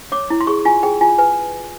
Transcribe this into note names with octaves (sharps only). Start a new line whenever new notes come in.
C#5 D6
E4
C6
G#4 C#6
F4 G#5
G#4 G5
F4 G#5
B4 G#5